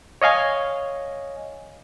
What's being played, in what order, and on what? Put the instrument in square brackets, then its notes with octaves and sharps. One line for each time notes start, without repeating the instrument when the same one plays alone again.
[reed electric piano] C#5 D#5 F5 G#5